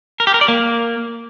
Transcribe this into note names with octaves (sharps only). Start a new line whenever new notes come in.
A#4
G4
A#4
D5
A#3